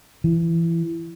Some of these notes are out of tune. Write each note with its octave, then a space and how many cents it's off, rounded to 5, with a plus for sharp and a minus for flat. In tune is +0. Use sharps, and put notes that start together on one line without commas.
E3 +20